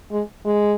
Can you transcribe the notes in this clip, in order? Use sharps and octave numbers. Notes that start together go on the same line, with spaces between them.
G#3
G#3